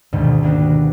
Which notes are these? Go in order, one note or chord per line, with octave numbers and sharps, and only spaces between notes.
D2 G#2 B2 D3 D#3
A#3 B3 D4 F#4 G4